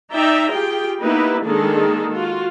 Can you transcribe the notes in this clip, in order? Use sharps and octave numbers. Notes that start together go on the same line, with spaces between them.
D#4 D5 E5 G5 A#5
F4 G4 G#4 G5
A#3 B3 D#4 E4 G4 B4
D#3 G#3 A#3 D4 G#4 A4
F4 F#4